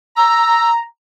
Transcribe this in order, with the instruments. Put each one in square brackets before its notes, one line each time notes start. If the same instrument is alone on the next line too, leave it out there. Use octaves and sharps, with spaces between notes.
[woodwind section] A#5 [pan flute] E6